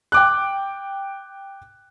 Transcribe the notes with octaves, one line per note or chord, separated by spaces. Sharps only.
G5 D6 F#6